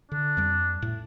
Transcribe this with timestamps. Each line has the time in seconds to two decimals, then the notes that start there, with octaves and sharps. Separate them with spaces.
0.12 D3 D4
0.37 F2 G3
0.82 A2